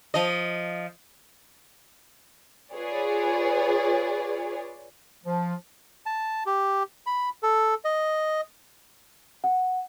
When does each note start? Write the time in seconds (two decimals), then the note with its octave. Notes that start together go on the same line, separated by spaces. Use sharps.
0.14 F3 D#5
2.74 F4 G#4 B4 C#5 D5
5.24 F3
6.06 A5
6.46 G4
7.06 B5
7.43 A4
7.85 D#5
9.44 F#5